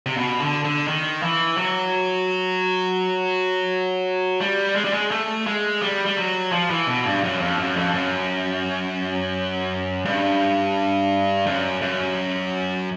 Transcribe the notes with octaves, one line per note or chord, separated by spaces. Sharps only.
C3
B2
D3
D3
D#3
E3
F#3
G3
G#3
G3
G#3
A3
G#3
G3
G3
F#3
F3
E3
B2
G2
F#2
F2
F#2
F2
F#2
G2
F#2
F#2